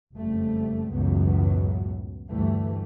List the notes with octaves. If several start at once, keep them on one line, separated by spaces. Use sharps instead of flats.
F#1 F2 G3 A3
C#2 F#2 A2 E3 F#3 B3
D2 G2 E3 G3 A3